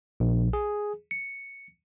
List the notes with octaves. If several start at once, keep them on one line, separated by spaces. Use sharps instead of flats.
A#1
G#4
C#7